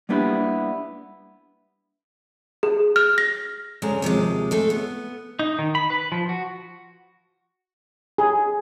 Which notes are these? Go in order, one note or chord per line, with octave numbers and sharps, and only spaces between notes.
G3 A#3 B3 D4 E4 G4
G#4
F6
A#6
D2 C#3 G#3 A#5
D#2 C3 F3 G#3
G#3 A3 A4
B3
D#4
D#3
B5
B4
F3
F#4
G#4